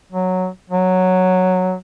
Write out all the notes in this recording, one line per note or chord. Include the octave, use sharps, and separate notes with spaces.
F#3
F#3